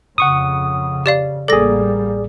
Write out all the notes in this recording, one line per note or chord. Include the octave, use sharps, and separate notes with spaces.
F2 C#3 F#5 C#6 D#6
G4 D5 F5
A1 G3 A#3 G#4 A4 D5 A#6